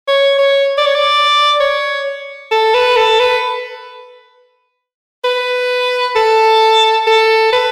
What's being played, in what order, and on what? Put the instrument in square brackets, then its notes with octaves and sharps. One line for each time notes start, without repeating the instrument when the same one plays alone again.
[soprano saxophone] C#5
C#5
D5
C#5
D5
C#5
A4
B4
A4
B4
B4
A4
A4
B4